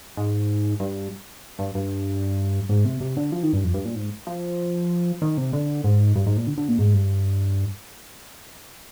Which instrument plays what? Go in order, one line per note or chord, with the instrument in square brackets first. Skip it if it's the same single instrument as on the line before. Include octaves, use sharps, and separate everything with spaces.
[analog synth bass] G#2
G2
G2
G2
G#2
C3
C3
D3
F3
D#3
G2
F2
G2
A#2
G#2
F3
D#3
C3
D3
G#2
G2
G#2
A#2
D3
D3
A#2
G#2
G2